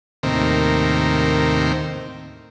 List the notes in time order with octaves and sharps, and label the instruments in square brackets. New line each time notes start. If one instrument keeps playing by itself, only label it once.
[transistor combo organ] D#2 A2 C3 D#3 A#3 C4